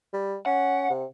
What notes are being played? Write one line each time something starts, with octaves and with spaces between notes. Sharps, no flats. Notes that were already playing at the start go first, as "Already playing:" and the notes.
G3
C#4 F#5
C3